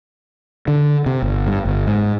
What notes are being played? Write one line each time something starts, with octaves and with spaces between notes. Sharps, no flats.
D3
C3
G1
G2
G1
G#2